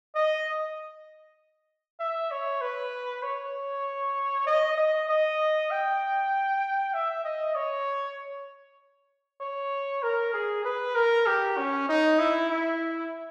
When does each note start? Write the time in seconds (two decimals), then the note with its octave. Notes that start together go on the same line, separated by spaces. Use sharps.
0.15 D#5
1.99 E5
2.31 C#5
2.61 B4
3.23 C#5
4.47 D#5
4.77 D#5
5.09 D#5
5.70 G5
6.93 E5
7.24 D#5
7.55 C#5
9.41 C#5
10.02 A#4
10.33 G#4
10.65 B4
10.95 A#4
11.27 G4
11.57 C#4
11.88 D#4
12.19 E4
12.50 E4